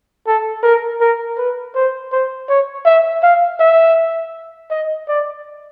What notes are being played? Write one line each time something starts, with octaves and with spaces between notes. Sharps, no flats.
A4
A#4
A#4
B4
C5
C5
C#5
E5
F5
E5
D#5
D5